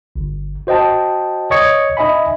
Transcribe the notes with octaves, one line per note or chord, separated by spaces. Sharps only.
G1
F#4 C5 D#5 G5 A5
C#5 D#5 C#6 D#6 G#6 C#7
D#4 D#5 E5 G#5 B5